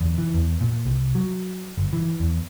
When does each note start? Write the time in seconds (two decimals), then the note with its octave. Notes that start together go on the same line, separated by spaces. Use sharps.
0.01 E2
0.18 E3
0.34 E2
0.61 A#2
0.85 C2
1.15 F#3
1.78 G1
1.93 E3
2.20 E2